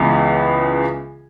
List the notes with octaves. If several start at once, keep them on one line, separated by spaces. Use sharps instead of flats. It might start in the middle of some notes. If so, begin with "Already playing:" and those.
Already playing: C#2 C#3 E3 B3